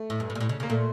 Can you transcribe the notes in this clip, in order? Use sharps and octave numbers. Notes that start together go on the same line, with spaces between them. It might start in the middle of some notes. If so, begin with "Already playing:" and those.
Already playing: A3
A2
G2
A2
A#2
A2
C#3
C#3 A#3
A#2 A3